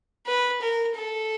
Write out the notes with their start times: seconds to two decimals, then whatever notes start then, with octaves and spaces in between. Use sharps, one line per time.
0.27 B4
0.61 A#4
0.96 A4